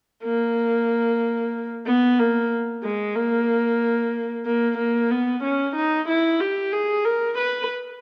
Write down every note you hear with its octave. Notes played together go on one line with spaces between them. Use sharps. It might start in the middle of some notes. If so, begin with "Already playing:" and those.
A#3
B3
A#3
G#3
A#3
A#3
A#3
B3
C#4
D#4
E4
G4
G#4
A#4
B4